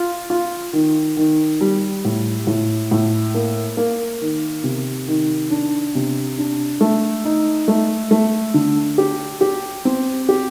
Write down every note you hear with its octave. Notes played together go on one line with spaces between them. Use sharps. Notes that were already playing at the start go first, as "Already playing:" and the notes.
Already playing: F4
F4
D#3
D#3
G3
A2
A2
A2
A#3
A#3
D#3
C3
D#3
D4
C3
D4
A3
D#4
A3
A3
D3
G4
G4
C4
G4